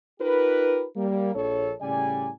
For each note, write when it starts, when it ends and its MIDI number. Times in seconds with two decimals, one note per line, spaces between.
0.20 0.85 63
0.20 0.85 65
0.20 0.85 67
0.20 0.85 70
0.20 0.85 71
0.96 1.30 55
0.96 1.30 58
1.34 1.73 34
1.34 1.73 69
1.34 1.73 73
1.81 2.30 45
1.81 2.30 49
1.81 2.30 55
1.81 2.30 74
1.81 2.30 80